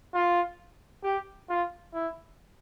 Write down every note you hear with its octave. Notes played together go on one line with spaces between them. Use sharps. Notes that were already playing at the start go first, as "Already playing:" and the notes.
F4
G4
F4
E4